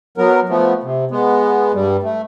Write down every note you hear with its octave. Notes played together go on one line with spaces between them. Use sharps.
F#3 B3 A#4
F3 A3 B3
C3
G#3 B3
G2 G3
A3